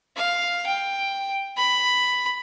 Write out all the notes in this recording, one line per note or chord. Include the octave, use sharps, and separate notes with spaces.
F5
G5
B5